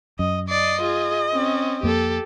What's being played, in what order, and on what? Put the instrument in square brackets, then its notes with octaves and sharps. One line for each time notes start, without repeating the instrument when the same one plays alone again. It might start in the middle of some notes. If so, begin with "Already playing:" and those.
[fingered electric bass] F#2 [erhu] D#5
[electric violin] D5 C7 [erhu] D#5
[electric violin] F4 G#4
C4 C#4
[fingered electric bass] F2 A#3 [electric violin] G4 A4